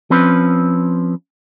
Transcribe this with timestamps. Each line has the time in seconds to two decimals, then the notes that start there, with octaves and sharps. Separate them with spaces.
0.10 F3 C4 C#4 B4